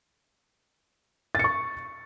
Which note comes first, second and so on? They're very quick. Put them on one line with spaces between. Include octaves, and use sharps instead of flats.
A6 C#7 C#6